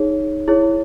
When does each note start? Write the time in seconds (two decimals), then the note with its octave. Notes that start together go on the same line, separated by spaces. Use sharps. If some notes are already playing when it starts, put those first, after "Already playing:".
Already playing: D#4 G#4 C#5
0.48 E4 G#4 C#5